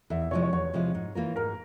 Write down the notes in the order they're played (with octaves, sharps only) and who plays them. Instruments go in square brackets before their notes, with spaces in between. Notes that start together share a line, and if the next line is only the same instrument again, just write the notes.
[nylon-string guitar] E2 [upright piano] E5
[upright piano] E5
[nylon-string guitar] C3 F3 G#3 E4 [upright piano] C#5
[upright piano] C#5
[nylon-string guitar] E2 [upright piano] C#5
[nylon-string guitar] C3 F3 G#3 E4
G#2
E3 A#3 F4 A#4
[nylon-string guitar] G#2 [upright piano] A#4